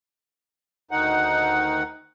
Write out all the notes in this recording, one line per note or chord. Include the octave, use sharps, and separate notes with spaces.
D2 D#3 D#4 F#5